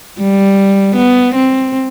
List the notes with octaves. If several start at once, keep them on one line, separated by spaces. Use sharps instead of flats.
G3
B3
C4